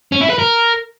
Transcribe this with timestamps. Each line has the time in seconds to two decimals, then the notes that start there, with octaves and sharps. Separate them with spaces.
0.12 C#4
0.21 E4
0.30 B4
0.38 A#4